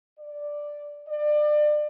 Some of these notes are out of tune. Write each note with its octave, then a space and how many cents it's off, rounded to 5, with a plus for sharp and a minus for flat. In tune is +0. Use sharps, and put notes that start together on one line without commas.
D5 +0
D5 +30